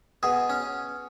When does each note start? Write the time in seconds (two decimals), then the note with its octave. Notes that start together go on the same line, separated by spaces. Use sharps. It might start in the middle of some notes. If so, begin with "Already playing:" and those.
0.23 B2 G#4
0.49 C#4